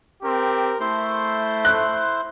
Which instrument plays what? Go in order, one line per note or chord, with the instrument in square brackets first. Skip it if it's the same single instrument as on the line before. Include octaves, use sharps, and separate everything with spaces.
[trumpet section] C4 G4 A#4
[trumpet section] A3 [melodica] E4 C5 C6
[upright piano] F#6